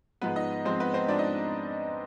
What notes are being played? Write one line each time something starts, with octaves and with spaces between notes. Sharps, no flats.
G#2 F3 G#3 B3 B4
D#4 D#5
G#2 F3 G#3 C4 C5
B3 B4
C4 C5
G#2 F3 G#3 D4 D5
D#4 D#5